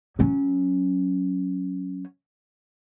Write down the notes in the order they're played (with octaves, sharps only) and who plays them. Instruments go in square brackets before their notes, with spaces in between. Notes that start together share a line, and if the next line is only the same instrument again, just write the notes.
[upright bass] F#3 C#4